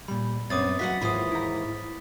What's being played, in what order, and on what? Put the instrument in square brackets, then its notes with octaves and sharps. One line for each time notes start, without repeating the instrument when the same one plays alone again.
[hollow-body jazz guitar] A#2 G3 [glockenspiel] B5
[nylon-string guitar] F#2 [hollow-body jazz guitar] B3 C4 [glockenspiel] D6 D#6 A6
[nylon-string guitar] E2 D#5 F#5 [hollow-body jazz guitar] F#3 F#4 F5 [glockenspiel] B6
[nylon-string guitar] D#2 G#2 E3 [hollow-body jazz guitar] F4 [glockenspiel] B5 D#6
[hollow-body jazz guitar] E4 A#5